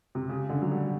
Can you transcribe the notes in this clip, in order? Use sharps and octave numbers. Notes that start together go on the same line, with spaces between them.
C3
C#3
D3
F#3
G3